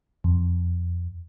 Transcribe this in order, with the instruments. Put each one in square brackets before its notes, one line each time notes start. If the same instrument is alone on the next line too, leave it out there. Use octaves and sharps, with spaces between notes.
[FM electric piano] F2